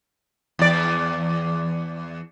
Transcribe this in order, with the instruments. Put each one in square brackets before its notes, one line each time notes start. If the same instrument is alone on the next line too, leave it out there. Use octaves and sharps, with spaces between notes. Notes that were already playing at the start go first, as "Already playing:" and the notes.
[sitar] E2 D5